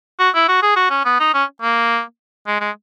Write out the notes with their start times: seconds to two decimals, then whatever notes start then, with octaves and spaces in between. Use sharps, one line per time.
0.20 F#4
0.35 E4
0.48 F#4
0.63 G#4
0.76 F#4
0.90 C#4
1.05 B3
1.20 D#4
1.34 C#4
1.62 A#3
2.47 G#3
2.60 G#3